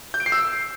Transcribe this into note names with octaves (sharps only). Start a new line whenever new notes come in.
G6
D7
C7
E6